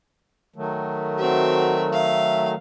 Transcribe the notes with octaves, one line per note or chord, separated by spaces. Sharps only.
D#3 F#3 A3
C4 F#4 E5
E5 F5